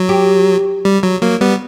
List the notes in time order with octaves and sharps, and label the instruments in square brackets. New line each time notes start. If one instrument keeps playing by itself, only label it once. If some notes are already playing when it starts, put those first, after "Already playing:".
Already playing: [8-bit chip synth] F#3
[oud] G4
[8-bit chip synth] G3
F#3
F#3 A#3
G3 B3